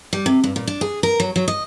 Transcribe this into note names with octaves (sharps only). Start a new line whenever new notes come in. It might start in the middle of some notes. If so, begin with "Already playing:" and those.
G3
C3
G2
A#2
D4
G#4
A#4
F#3
F#3
D#5